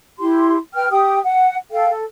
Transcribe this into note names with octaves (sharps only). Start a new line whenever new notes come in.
E4 G4 C6
B4 G5 F6
G4 G5 D#6
F#5
A4 F5 G5
A4